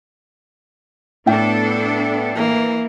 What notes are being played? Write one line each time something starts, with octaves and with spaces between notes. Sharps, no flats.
A2 B3 D4 A4 G5
E3 A#3